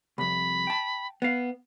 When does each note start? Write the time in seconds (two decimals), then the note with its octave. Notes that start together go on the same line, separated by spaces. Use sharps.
0.18 C2 F2 B5
0.67 G5 A5
1.22 B3 F5